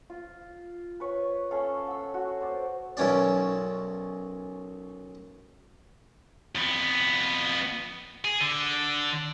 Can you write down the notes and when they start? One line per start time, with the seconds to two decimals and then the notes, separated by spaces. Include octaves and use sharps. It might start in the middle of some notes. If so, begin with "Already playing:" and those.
0.10 F4
1.00 B4 C#5
1.51 C#4 A4 C#5 F5
1.87 F#5 E6
2.14 F#4
2.41 C5 D5
2.97 B1 F#2 C#4 D5
6.55 F2 B3
8.25 G#4
8.41 D3